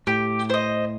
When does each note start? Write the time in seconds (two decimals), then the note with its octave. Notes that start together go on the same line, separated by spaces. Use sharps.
0.07 A2 G4
0.50 C5 D#5